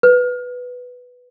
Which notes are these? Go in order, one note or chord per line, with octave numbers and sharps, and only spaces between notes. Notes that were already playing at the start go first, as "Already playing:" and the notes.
B4